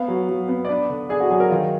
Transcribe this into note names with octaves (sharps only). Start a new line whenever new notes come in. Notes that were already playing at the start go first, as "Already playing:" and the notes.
Already playing: B3 F5
F#3
F#3
B3
D5
D4 B4
D3
D4 G#4
F#4
F#3 G#4
A#4
D#3 F4